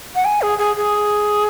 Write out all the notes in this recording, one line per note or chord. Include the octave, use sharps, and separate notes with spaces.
F#5
G#5
G#4
G#4
G#4